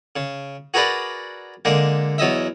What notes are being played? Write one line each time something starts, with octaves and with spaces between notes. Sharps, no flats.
C#3
F#4 G#4 A#4 B4 D5
D3 G#3 A#3
E2 F#3 D#5 E5